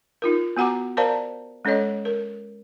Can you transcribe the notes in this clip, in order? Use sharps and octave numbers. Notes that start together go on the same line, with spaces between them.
D#4 F4 A#4
B3 F#4 F#5 A#5 D6
A#4 C5 D5 F5 A5 A#5
G#3 C#4 A4 C#5 D#5
A#4